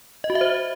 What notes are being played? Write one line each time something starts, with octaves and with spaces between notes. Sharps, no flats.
D#5
F#4
E5
C5